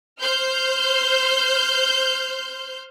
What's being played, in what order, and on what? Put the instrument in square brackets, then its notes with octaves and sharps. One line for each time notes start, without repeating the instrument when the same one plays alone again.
[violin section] C5 F6 G6